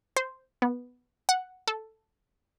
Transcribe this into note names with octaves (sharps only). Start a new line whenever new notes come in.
C5
B3
F#5
A4